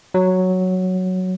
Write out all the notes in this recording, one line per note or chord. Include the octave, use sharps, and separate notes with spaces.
F#3